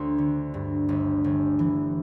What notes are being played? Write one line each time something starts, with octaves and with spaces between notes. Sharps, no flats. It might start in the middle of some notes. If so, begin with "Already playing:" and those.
Already playing: D2 C5
D3
G2
G1
G1
E3